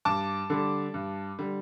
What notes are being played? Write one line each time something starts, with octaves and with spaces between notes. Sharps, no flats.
G2 A5 D6
D3 G3
G2
D3 G3